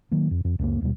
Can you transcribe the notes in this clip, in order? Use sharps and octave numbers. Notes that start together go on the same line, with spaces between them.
D#3 F#3 A#3
F2
F2
C#2 F#2 F3 A#3
D#1 D#2 B2 G3